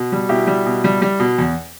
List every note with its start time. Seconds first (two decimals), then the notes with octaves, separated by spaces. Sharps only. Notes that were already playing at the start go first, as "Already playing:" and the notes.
Already playing: B2
0.12 G3
0.29 B2 E4 G4
0.47 G3
0.66 B2
0.84 G3
1.02 G3
1.20 B2
1.38 E2